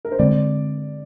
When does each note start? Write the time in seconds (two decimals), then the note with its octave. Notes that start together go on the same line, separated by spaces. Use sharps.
0.05 A#4
0.12 C5
0.19 D3 G#3 C4 D5